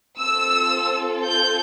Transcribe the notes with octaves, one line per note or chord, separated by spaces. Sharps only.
C4 F4 A4 E6
G6